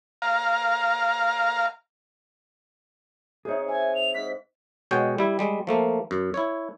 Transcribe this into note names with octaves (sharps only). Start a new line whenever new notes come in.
F5 A#5
C3 D#4 G#4 C#5
E5 G#5
F7
G#2 F#5 B6
B2 G#3 C#5 F#5 G5
G3 E4
G3 G#3
F3 A3 A#3
F#2
E4 C#5